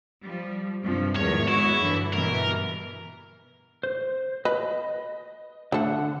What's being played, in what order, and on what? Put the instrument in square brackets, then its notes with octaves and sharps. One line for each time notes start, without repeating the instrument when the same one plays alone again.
[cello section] F3 G3
G2 C3 F3
[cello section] E2 G#2 D#3 [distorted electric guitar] C#5
[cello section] G#3 F#4 C#5 [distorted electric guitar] E4
[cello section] G2 D3 E3
[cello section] G2 B2 E3 [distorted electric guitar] A#4
[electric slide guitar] C5
[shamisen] B4 [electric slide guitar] D#5
[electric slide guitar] D3 F#5 [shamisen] A3 A4